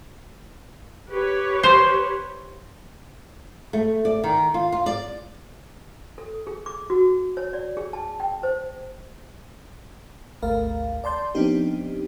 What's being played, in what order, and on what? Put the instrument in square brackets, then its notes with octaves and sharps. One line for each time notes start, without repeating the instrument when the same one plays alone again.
[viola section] G4 B4 C#5
[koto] C5
[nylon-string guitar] A3
D5
D#3
F4
F4
D5
[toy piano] A4
G#4
D6
F#4
C#5
D5
G#4
A5
G5
C5
[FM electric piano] G#1 D2 A3 A#4 F5
D5 A5 C6 G6
F3 B3 C4 D4 D#4 G4